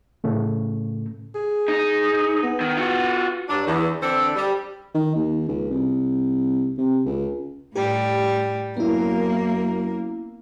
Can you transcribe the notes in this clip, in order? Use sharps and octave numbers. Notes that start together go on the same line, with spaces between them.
A2 C#3 A3
G#4
D#4
B3
D#3
F4 F#4
G2 F#3 D4
E2
D3 E3 C4 D4 A4
G3
D#3
D#2
C#2
C2
C3
C#2
A2 G3 G4
F#2 A#3 B3 E4 A#4